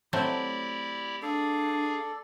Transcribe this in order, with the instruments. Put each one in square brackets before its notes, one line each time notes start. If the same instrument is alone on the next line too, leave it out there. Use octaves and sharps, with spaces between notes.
[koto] F#3 A3 C4 [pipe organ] E4 G4 D5
[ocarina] D4 [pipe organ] G#4 F5 [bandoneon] A4 D5